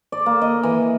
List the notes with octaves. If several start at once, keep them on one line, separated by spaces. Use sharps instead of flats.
D5
A#3
D#5
E3